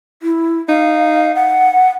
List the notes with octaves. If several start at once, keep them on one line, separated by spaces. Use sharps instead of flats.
E4
D#4 F5
F#5